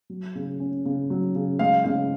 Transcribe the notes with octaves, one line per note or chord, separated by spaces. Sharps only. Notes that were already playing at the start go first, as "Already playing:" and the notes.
F#3
C#3
C#4
C#3
F#3
C#3
G#3 F5
C#3 F5